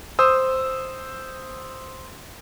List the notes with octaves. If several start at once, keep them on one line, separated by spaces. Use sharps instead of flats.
C5 D#6 E6